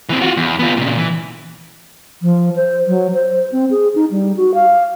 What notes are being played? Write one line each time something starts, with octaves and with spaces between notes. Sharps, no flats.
E3 C4
F4 F#4
E2
B3 F4
A#2 C#3
E3
F3
C5
F#3
C5
C4
G#4
D#4
G3
F#4
F5